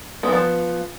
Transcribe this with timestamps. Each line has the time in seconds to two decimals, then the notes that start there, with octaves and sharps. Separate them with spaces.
0.23 B3
0.28 E3
0.32 F3